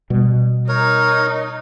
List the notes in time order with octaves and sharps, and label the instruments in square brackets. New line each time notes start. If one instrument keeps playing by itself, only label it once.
[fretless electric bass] B2 G3
[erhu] D#4 [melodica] A#4 C#5